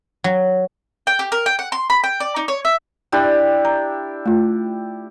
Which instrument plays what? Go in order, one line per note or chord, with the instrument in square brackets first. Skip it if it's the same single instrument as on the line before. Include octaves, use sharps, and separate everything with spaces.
[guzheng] F#3
[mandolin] G5
G4
A#4
G5
F#5
C6
B5
G5
D5
D#4
C#5
E5
[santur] D4 E4 G4
[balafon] A#5
A3 F4